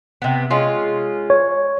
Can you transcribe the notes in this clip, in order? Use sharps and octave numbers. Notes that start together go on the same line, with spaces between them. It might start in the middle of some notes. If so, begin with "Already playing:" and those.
C3 B3
G#3 C#4 F4
C#5